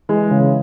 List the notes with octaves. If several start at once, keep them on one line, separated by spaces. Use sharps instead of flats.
E3 G#3
C#3